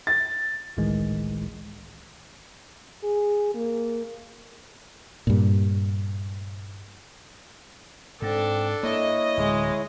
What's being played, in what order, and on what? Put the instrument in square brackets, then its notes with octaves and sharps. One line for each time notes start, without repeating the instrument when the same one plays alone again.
[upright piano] A6
[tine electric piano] G#1 C#2 A2 D#3 E3 G#3
[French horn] G#4
A#3
[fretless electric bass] G2 A#2
[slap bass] G#2 [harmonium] C4 [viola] D4 A4
[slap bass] A#3 [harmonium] E4 C#5 [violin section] D#5
[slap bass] D1 [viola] G#3